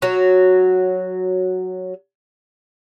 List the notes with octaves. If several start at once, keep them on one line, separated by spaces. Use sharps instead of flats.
F#3 F#4